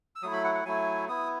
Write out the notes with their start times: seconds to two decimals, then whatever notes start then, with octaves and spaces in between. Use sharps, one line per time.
0.16 E6
0.22 F#3 A3 E4 D#6
0.33 B5
0.44 F#5
0.55 F#5
0.65 F#3 A3 E4 G#5
1.09 B3 E4 D#6